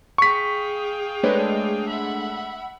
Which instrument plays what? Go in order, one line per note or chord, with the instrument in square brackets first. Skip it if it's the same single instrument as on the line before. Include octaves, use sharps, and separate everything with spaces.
[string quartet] G#4 F5 G5 [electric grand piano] C#6 B6
[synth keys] G#3 A3 D4 [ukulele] B4 C#5
[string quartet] E5 F#5 B5